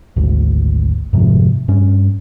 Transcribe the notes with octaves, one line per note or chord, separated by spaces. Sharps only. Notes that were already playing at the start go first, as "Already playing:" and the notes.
G#1 D2
F2 G#2 C3 F3
G2 C#4